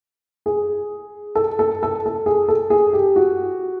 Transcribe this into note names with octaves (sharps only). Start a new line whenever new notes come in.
G#4
A4
A4
A4
A4
G#4
A4
G#4
G4
F#4